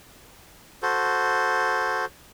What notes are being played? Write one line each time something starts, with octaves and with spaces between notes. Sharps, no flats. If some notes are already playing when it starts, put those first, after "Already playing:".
F#4 A4 C5